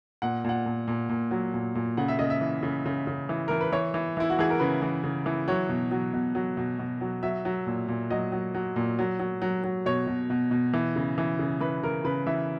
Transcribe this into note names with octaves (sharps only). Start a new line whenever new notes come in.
A#2 F#5
A#2 F#5
A#2
A#2
A#2
F#3
A#2
A#2
C#3 F#5
E5
C#3 D#5
E5
E3
C#3
C#3
C#3
E3
E3 A#4
B4
E3 C#5
E3
E3 E4
F#4
E3 G#4
A#4
C#3 B4
E3
C#3
E3
F#3 C#5
B2
F#3
B2
F#3
B2
B2
F#3
F#3 E5
F#3
A#2
A#2
F#3 D#5
F#3
F#3
A#2
F#3
F#3
F#3
F#3
B2 C#5
B2
B2
B2
E3
C#3
E3
C#3
E3 B4
C#3 A#4
C#3 B4
E3 E5